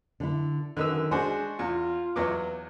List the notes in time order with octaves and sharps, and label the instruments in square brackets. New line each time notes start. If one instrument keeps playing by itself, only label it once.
[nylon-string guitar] D3 E4
[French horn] F#2 [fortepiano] D3 B4 E6 [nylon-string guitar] D#3
[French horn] G#3 [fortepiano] D4 F#4 C5 [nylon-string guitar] G#5
[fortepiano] E2 [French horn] F4
[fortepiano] E2 F#3 D6 [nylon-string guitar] B4 E5